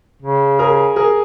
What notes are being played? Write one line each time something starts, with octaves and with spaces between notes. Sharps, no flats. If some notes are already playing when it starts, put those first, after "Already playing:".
C#3
G#4 A#4
G#4 A#4